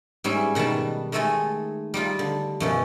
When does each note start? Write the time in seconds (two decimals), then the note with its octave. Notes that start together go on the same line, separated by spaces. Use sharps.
0.24 G#2 G3 C#4 G#4 E5
0.55 B2 D#3 G3 B3 A5
1.12 D#3 G#3 A3 A4 D#5 G#5
1.94 G3 D#4 F4
2.19 D3
2.60 F#2 B2 F3